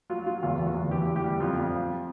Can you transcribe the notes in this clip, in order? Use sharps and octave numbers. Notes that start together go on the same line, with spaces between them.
F#3 F4
F#3 F4
E2 F4
E2
F#4
E2
E3 G4
E2
G4
G3
F2 F4
F2